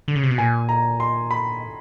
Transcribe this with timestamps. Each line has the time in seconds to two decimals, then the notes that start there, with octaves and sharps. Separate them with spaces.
0.08 D3
0.16 C#3
0.23 C3
0.31 B2
0.38 A#2 G#5
0.69 A#5
1.00 C6
1.31 B5